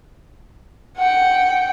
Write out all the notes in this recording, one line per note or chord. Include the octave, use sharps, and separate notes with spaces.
F#5 G5